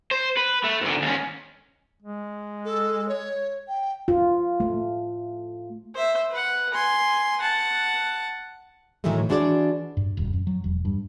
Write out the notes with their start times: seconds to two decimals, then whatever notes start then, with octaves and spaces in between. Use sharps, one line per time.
0.11 C5
0.37 B4
0.64 A3
0.82 G#2 D3
1.02 D#2 C#4
2.03 G#3
2.65 A4
3.09 C#5
3.68 G5
4.08 F4
4.60 A3
5.95 C5 E5
6.31 B4 F#5
6.74 G#5 C6
7.41 F#5 A5
9.04 A2 D#3 E3 F#3 G#3 A3
9.29 E3 G#3 D4 F#4 G#4 D5
9.97 G2
10.17 D#1
10.33 F#2
10.47 F#3
10.64 E1
10.85 G2